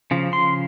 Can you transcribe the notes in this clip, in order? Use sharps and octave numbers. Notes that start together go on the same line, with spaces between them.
C#3 F3
C6